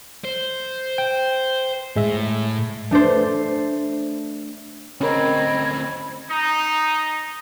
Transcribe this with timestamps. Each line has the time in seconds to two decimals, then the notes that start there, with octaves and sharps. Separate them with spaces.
0.25 C5
0.98 G5
1.96 A2 G#3 E5
2.91 A3 D4 A4 C5
5.01 D2 C4 C#4 A#4 D#5 G5 B5 G#6
6.29 D#4